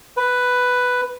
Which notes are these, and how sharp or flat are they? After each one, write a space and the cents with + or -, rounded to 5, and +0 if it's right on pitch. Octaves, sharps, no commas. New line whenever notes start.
B4 +5